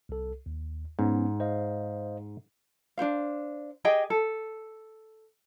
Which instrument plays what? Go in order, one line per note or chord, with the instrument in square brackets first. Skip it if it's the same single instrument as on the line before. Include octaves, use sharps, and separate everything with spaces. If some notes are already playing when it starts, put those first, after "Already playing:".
[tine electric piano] C2 A4
D#2
[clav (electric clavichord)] G#2 [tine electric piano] B3 C#4
[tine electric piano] C5 D#5 F5
[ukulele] D4 F#4 C5 F5
G4 G#4 D#5 G5
A4